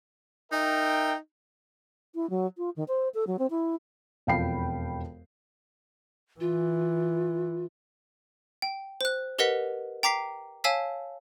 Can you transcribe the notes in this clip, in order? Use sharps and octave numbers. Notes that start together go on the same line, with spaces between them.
D#4 A#4 E5 G5
E4
F#3
F4
D#3
C5
A4
F#3
C4
E4
E1 F2 F5 G5 B5 C7
E3 F4
G5
C5 F#6
G4 A#4 B4 D#5 F#5 B6
G5 A#5 D6 B6 C7
C#5 F5 G#5 A5 E6 B6